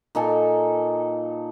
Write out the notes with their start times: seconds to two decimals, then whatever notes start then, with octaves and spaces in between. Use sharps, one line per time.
0.15 A#2 D#4 A4 G#5